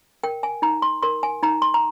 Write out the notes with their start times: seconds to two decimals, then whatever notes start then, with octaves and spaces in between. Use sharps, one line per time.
0.24 A#4 G5
0.43 G#5
0.62 D#4 A#5
0.82 C6
1.03 A#4 C6
1.23 G#5
1.43 D#4 A#5
1.62 C6
1.74 A#5